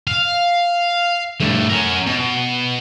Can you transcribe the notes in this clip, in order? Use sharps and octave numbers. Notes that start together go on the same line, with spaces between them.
F5
G2 A3
C#4 A#4
B2